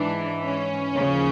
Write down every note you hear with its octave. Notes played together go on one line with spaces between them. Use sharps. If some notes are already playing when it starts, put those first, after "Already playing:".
Already playing: G#2 E3 D4
C#4
D#2 C#3 F3